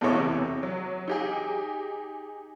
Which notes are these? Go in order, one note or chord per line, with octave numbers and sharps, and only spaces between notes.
E2 B2 E3 A4 C#5 D6
C3
F#3
D#4 G4 G#4